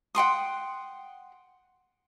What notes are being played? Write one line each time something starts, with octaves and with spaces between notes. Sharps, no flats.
F#5 G5 C6 D#6